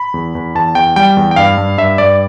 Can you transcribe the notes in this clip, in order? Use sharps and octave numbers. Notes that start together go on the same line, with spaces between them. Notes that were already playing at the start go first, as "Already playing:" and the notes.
Already playing: B5
E2
E2
E2 A5
E2 G5
G3 G5
E2
G5
G2 F5
G2
G2 E5
G2 D5